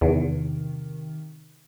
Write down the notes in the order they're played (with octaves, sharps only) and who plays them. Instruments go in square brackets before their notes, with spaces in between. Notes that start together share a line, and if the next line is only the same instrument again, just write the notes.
[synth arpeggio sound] E2 [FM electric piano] C3 D#3